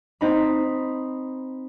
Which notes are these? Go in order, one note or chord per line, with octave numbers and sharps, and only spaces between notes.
C4 D#4 B5